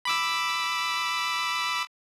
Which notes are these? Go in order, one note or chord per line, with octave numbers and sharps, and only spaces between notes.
B5 D6 E6